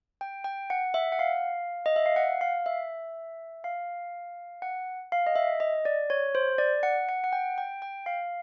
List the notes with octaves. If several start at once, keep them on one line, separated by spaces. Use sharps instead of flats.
G5
G5
F#5
E5
F#5
F5
D#5
E5
F5
F#5
F5
E5
F5
F#5
F5
D#5
E5
D#5
D5
C#5
C5
D5
F#5
F#5
F#5
G5
G5
G5
F5